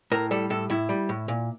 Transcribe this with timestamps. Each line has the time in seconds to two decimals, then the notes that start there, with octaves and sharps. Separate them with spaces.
0.12 A2 A#4
0.31 G3 A4
0.50 A2 A4
0.70 A2 E4
0.89 G3
1.09 A2
1.28 A#2